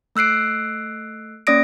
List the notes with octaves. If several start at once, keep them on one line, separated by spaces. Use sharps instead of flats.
A3 E6 F#6 C7 D7
A#3 C#4 D5 D#6 A#6 D7